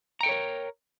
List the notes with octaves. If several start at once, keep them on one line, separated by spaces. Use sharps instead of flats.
A4 A#4 C#5 G5 A#5